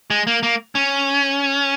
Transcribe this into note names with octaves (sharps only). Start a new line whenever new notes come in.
G#3
A#3
A#3
C#4